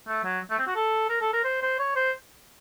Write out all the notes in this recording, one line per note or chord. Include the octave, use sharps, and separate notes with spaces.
A3
F#3
A3
C4
F#4
A4
A#4
A4
A#4
C5
C5
C#5
C5